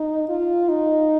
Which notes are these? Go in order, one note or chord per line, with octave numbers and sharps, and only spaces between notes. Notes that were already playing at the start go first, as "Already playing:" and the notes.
Already playing: D#4
F4
D#4